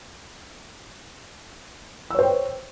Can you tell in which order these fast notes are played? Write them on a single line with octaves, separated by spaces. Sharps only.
E6 C#5 C5 G5